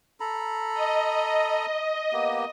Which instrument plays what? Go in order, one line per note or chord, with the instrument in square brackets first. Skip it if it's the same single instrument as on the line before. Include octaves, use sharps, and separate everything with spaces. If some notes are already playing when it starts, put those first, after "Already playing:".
[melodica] A4 A#5 B5
[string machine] D#5
[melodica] A#3 B3 G4